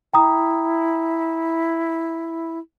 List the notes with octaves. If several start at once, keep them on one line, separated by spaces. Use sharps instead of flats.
E4 G5 A#5 D#6